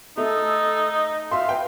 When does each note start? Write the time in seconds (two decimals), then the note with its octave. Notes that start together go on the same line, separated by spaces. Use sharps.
0.17 A3 D#4 A4
0.92 D#5
1.32 E5 F5 C6
1.49 B4 G5